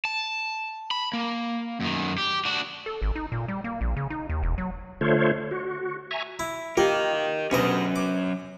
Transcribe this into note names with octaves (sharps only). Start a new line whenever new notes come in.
A5
B5
A#3
F#2 D#3
G4
D4 F#4
A4
G#1
D#4
A#2
G3
A#3
A#1
C#3
D#4
D#2
E1
F#3
D3 A3 F4 C5 C#5
F#4
E5 G#5 A#5 C#6
E4
A#3 G4 A#4 D#5
D2 B2 F#3 C#4 D#5
D6